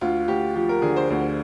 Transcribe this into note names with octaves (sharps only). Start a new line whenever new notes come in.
D2 F4
D2 G4
F3 G4
A#4
D3 G#4
C5
D2 C5